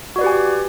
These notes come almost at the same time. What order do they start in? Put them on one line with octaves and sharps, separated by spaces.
F#4 D5 B4 G4 G#5